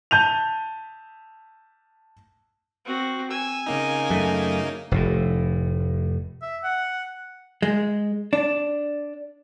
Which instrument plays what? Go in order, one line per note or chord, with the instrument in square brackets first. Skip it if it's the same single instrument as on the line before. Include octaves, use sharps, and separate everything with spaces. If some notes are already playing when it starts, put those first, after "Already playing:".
[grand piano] A5 G6 D#7 F7
[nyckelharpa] C4 F#4
[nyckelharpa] G#5 [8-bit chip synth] E6
[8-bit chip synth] C#3 A#3 D#4
[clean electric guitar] F#2 A3
[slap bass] F1 A2
[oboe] E5
F#5
[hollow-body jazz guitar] G#3
D4